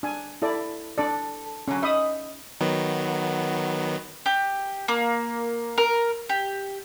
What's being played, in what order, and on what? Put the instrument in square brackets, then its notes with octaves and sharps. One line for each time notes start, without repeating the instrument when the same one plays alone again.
[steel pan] D4 G#5
E4 A4 D5
[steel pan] D4 D5 [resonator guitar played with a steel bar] A4
[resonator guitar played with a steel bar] D3 F#3 [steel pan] C#4
[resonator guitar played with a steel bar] D#4 D#5 [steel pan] E5 B5 D#6
[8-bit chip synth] D#3 F#3 B3
[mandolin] G4
A#3
A#4
G4